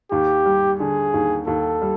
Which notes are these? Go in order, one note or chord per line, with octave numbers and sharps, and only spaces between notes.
D#2 G4
G3
D3 G#4
D#2
D#2 A4
G3